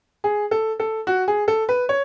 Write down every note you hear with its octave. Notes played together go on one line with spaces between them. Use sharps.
G#4
A4
A4
F#4
G#4
A4
B4
C#5